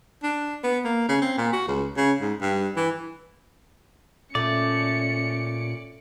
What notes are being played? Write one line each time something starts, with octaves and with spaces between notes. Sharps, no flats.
D4
B3
A#3
C#3
C4
A#2
F#4
C#2
C#3
G#2
G2
E3
A#2 A3 C#4 D5 C#7